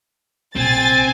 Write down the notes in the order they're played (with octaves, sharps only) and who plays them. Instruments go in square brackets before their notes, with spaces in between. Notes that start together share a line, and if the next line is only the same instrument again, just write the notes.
[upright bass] A#1 C3 [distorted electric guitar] C4 [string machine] G#5 [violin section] A6